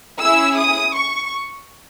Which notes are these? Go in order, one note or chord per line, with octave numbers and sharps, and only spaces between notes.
C#4 E4 G#4 E6
D#6
C#6